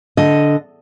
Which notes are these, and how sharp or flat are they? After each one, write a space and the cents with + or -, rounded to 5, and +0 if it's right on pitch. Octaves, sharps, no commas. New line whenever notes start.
D3 -10 D#5 +0